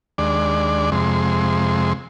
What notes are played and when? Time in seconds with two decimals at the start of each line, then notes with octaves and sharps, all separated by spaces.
0.18 D#2 G#3 D4 D5
0.92 F2 C3 G#3 C6